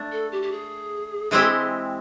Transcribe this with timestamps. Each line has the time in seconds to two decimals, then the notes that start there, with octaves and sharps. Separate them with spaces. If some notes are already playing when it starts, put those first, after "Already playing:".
Already playing: A3 D4
0.12 A4
0.32 G4
0.42 G4
0.51 G#4
1.31 E3 G#3 C4 E4 G4